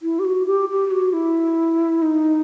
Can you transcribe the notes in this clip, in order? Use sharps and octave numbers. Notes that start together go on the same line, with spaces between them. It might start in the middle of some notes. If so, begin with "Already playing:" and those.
E4
G4
F#4
G4
G4
F#4
E4
D#4